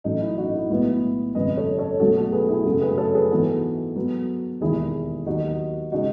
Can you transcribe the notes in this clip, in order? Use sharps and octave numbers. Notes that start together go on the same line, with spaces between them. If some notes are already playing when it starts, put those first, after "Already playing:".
A1 A2 F#3 A3 C#4 D#4
E4
D#4 F#4
E4
B1 A2 G#3 B3 E4
G#1 F#2 C#3 B4 D#5
A4 C#5
A4 C#5
B1 B2 F#3 A3 C#4 F#4 A4
F#4 A4
G#4 B4
E4 G#4
F#2 C#3 F#3 A3 F#4 A4
G#4 B4
A4 C#5
G#4 B4
G#2 E3 B3 F#4 A4
G#2 F#3 B3
E1 D#2 D#3 E4 G#4
D#2 D#3 F#3 D#4 F#4
C#3 G#3 D#4 F#4